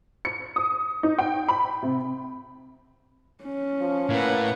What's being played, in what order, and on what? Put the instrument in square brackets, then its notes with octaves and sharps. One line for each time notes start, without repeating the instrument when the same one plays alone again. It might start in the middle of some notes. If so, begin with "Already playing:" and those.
[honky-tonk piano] C#7
D#6
D#4
G5
B5
C3
[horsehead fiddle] C#4
[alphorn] F3
[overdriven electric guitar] A2 [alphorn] A#3 [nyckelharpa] B4 F#5